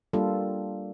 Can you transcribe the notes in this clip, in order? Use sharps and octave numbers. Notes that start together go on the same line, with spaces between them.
G3 A#3 D4 F4 A4